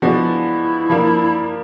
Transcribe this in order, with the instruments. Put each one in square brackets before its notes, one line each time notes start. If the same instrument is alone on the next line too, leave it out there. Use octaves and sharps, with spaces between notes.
[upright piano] F3 G#3 B3 D4 F#4 [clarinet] E4
[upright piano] F3 A#3 D4